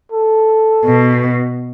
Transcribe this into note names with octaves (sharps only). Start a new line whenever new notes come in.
A4
B2